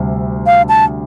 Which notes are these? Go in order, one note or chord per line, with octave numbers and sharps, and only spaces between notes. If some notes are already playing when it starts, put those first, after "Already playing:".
Already playing: D2 C3 G3
F5
A5